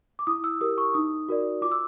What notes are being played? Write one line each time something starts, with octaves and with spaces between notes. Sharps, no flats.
D6
E4 D#6
E6
G4 A#4 D#6
C#6
D#4 D#6
F#4 A#4 D5
F4 D6
E6